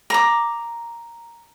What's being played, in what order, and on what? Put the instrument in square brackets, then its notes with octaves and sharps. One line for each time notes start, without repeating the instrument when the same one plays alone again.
[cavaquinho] A#5 D6